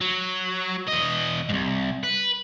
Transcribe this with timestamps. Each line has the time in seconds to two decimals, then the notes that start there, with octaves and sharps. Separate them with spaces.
0.01 F#3
0.88 E2 D#5
1.49 C2 G#2
2.03 B4